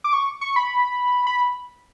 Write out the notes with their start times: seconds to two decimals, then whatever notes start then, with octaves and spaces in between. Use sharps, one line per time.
0.04 D6
0.13 C#6
0.41 C#6
0.56 B5
1.27 B5